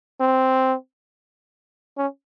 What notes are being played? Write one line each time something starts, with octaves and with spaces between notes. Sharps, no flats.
C4
C#4